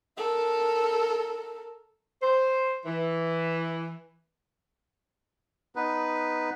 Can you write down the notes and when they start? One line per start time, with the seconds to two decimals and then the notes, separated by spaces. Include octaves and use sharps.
0.18 A4 A#4
2.21 C5
2.85 E3
5.76 B3 D#4 B4